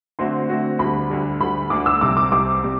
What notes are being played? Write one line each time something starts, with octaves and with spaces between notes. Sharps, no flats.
D3 A3 C4 F#4 C6
D3 A3 C4 F#4
D2 D3 G3 B5
D2 D3 G3
D2 D3 G3 B5
D2 D3 G3 D6
E6
C2 C3 G3 C4 D6
D6
C2 C3 G3 C4 D6
C3 G3